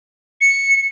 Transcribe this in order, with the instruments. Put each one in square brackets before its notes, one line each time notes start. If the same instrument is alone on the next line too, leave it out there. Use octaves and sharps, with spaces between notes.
[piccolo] C#7